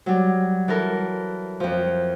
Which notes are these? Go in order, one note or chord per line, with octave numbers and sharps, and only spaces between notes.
F#3 G3
E3 A4 A#4
F2 F3